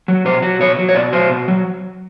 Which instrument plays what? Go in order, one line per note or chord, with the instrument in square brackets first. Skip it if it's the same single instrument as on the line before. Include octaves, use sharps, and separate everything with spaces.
[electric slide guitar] F#3
B2 C5
F#3
B2 C#5
F#3
C#5
B2 D5
F#3 C5
B2
F#3